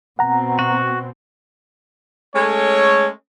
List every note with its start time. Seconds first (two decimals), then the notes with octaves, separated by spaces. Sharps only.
0.19 B2 C4 F#5 A#5
0.59 F#4
2.34 G#3 A3 C#4 A4 C#5